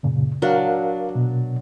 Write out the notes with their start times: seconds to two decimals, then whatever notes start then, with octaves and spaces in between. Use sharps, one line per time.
0.03 F#2 A#2 C#3
0.42 F#3 D4 A#4 F5
1.15 B2